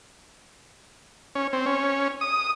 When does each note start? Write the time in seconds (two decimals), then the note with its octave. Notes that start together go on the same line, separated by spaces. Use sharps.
1.35 C#4
1.53 C4
1.66 C#4
2.21 D#6